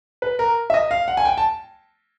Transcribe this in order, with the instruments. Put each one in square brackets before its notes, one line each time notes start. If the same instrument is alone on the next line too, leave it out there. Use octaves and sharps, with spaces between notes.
[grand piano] B4
A#4
E5
D#5
F5
F#5
G#5
G5
A5